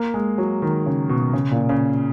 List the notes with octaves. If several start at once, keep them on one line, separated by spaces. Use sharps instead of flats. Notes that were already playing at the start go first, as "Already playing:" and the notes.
Already playing: A#3
G#3
F#3
D#3
C#3
B2
C#3
A#2
C#3